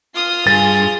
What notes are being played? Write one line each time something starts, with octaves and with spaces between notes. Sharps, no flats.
F4 D#6 F6 C7
G2 G#4 A6